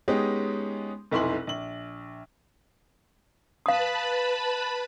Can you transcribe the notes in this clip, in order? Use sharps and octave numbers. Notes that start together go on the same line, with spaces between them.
G#3 B3 C#4 D#4 G4 G#4
F1 B1 E4 C6 F#7
A#1 F#7
B4 F5 A5 B5 D#6